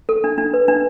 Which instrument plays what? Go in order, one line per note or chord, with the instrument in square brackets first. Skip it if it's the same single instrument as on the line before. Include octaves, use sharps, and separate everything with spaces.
[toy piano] A4
D4
D4
B4
D4